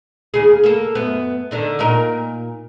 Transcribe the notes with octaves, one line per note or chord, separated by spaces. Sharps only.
D#2 C#3 G#4
A#3 A4
F#2 B3
D3 D#3 D4
A#2 D#4 A#4